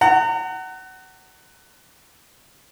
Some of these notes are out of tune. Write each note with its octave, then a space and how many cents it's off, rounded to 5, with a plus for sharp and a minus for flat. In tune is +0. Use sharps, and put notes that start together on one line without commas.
F#5 +25 A#5 -35